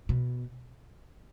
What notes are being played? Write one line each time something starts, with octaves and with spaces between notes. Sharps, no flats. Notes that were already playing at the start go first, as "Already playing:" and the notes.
B2